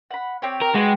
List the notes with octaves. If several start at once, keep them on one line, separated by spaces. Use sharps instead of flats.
F#5 B5
C4 G4 C#5
A#4
G#3 F#4 G4 B4